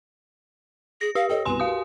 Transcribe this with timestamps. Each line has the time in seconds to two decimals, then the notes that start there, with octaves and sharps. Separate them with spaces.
1.01 G#4 A#6
1.15 G4 F5
1.29 A4 C#5 D#5 G5
1.45 C2 B2 B4 G#5 C6
1.60 F#4 G4 A#4 F5 D#6